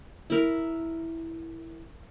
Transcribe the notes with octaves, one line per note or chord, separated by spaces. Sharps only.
E4 A#4